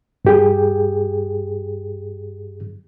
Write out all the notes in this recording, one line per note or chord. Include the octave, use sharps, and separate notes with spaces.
G2 G4 G#4